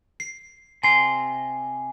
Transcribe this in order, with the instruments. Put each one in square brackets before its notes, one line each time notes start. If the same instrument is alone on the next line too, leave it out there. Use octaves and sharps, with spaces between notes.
[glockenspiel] C7
[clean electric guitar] C3 C6 [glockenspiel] G#5